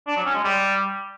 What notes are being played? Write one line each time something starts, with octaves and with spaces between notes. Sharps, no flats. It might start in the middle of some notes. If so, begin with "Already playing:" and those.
D4
F#3
C#4
G#3
G3